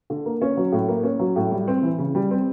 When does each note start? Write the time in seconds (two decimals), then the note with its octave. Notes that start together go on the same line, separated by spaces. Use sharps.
0.10 D3
0.26 A#3
0.42 C#4
0.57 F#3
0.72 A2
0.88 A#3
1.04 C#4
1.19 F#3
1.36 A2
1.51 G3
1.68 C4
1.83 E3
1.98 C#3
2.15 G3
2.31 C4